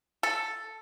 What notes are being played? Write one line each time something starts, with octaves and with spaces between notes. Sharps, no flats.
A4